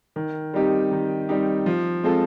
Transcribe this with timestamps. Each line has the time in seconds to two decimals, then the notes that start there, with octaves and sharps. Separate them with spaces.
0.16 D#3
0.54 G3 C4 D#4 G4
0.91 D#3
1.29 G3 C4 D#4 G4
1.66 F3
2.04 G#3 C4 F4 A4